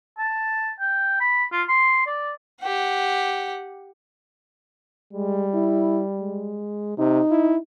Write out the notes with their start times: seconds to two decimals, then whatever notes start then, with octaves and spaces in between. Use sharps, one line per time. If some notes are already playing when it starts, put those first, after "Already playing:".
0.18 A5
0.80 G5
1.20 B5
1.52 F4
1.68 C6
2.06 D5
2.62 G4 F#5
5.13 G3 G#3
5.54 E4
6.21 G#3
6.98 C3 D#4
7.31 E4